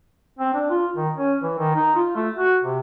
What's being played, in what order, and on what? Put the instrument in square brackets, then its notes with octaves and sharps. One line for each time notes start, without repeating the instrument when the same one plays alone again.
[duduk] C4
D4
F4
D#3
C#4
E3
D#3
D#4
F4
A3
F#4
C3